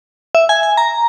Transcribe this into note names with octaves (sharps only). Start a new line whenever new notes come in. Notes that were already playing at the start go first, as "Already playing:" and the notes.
E5
G#5
G#5
A#5